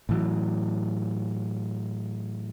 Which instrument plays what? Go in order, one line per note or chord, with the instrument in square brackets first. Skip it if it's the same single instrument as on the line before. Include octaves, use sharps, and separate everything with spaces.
[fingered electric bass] A2 E3 F#3